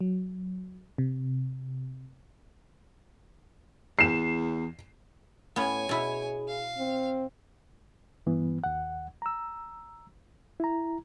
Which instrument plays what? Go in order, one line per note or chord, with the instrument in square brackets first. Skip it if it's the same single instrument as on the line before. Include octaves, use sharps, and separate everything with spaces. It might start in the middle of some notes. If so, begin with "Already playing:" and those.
[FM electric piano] F#3
C3
[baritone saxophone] E2 [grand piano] C7 E7
[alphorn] A2 [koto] B3 C#4 [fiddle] C#5 G#5
[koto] B2 E4 [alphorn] G#4
[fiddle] F5
[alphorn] C4
[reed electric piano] G2 E3 B3
D#2 F#5
A#5 E6
E4 A#5